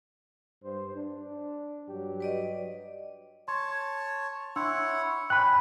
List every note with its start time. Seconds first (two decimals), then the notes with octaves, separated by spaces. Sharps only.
0.63 G2 C5
0.96 D4
1.89 G2 F#3 G4
2.20 B4 D5 D#5
3.48 C#5 A5 C6 G#6
4.56 D4 E4 C#5 F#5 C6 E6
5.30 C#4 G5 B5 F#6